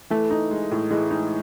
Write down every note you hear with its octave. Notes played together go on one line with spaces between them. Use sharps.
E3 A3
D#4
G#3
A2
E3 G#3
D#4